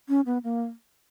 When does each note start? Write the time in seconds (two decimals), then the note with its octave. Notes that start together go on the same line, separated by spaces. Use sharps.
0.09 C#4
0.26 B3
0.44 A#3